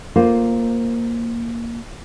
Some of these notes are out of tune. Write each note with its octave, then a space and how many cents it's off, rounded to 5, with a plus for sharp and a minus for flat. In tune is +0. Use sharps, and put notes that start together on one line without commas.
A#3 +0 F4 +0 C5 +0